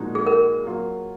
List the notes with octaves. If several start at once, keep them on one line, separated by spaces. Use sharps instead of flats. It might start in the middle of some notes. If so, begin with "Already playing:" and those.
Already playing: A#2 F3 G#3 D#4 F#4
G#4
A#4
F#3 A#3 F4